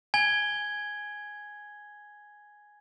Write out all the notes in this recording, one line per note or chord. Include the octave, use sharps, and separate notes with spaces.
G#5 G#6 G7